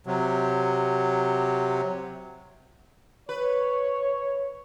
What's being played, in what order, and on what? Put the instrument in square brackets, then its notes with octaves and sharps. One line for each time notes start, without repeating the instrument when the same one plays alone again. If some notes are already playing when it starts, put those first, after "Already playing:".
[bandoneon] C3 F#3
[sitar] B4 [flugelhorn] C#5